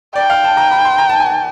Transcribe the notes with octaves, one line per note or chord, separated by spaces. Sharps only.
D5 G5
F5
A5
A#5
B5
C6
A#5
A5
G#5
A5